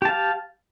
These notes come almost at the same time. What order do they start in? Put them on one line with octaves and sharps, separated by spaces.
G4 A5 F5